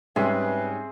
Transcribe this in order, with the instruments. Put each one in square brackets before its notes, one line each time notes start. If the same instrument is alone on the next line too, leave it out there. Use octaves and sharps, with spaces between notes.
[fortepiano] G#2 G3 C#4 [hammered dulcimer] C4 G#4 [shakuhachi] B4 [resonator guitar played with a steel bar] E5